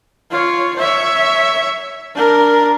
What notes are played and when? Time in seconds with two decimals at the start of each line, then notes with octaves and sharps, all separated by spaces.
0.31 F4 C#5
0.77 C#5 E5
2.15 D4 A#4